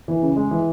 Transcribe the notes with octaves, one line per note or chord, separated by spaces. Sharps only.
E3
C#3
G#3
E3